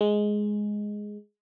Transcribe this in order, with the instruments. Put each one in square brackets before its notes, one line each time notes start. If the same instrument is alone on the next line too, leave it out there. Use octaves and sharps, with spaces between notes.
[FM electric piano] G#3